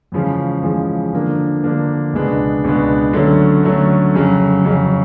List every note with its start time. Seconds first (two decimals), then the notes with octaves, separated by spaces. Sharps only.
0.12 E2 C#3 F3 G#3
0.63 E2 C#3 F3 G#3
1.13 D3 F3 A#3 D4
1.64 D3 F3 A#3 D4
2.13 C#2 B2 G#3 B3 D4
2.64 C#2 B2 G#3 B3 D4
3.13 D3 F#3 A3 C#4
3.63 D3 F#3 A3 C#4
4.14 F2 C#3 F#3
4.64 F2 C#3 F#3